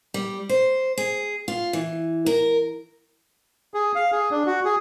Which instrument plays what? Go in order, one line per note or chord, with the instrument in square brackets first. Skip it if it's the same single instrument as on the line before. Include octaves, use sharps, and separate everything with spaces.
[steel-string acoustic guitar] G3
C5
G#4
F4
E3
A#4
[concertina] G#4
F5
G#4
D4
F#4
G#4